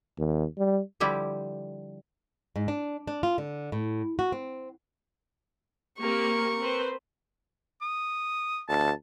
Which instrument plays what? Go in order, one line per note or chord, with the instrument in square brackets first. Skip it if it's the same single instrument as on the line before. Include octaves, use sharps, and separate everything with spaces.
[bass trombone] D#2
G3
[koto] D3 F3 G3 E4 G4
[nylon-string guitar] G#2
D4
D4
F4
D3
A2
F#4
C4
[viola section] A#3 C4 G4 [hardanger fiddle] A#4 C#6
[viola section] C4 B4 C5
[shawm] D#6
[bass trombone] D2 [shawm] A5